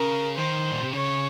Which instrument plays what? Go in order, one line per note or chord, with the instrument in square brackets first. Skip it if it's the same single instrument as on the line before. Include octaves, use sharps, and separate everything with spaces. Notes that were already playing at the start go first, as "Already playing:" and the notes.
Already playing: [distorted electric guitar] C#3 [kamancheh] A#4
[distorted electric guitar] D#3 [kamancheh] C5
[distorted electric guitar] A#2
C3
[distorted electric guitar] C#3 [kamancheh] C#5